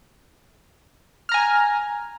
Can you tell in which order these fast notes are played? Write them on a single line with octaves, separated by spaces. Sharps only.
F6 A#5 G#5